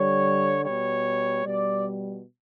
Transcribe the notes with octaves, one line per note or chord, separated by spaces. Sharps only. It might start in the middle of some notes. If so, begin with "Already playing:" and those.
Already playing: D3 G3 C#5
B2 G3 C#5
B2 G3 D5